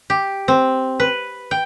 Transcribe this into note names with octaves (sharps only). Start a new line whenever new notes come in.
G4
C4
B4
G5